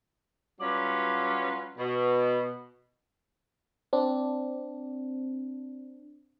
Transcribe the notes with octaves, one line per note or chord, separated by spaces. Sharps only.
F#3 G3 C#4 F4 B4 D5
B2
C4 D4